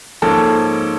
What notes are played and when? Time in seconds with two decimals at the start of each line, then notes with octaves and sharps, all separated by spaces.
0.22 G#2 F3 A#3 C#4 A4